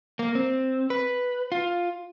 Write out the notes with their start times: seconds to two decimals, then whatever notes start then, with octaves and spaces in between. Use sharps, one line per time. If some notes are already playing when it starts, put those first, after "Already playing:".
0.19 A#3
0.35 C4
0.90 B4
1.52 F4